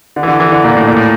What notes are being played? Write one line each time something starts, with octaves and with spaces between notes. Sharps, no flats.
D3
E3
D3
E3
D3
A#2
A2
A#2
A2